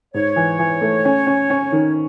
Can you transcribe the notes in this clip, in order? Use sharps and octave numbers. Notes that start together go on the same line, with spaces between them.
G#2 C#5
E3
E3
A3
C#4
C#4
C#4
D#3